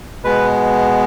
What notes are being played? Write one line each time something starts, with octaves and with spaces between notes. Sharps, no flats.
B2 G#3 B3 B4